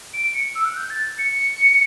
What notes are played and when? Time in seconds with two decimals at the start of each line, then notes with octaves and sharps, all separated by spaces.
0.13 D7
0.34 C#7
0.55 E6
0.65 F#6
0.76 G6
0.90 A6
1.18 C#7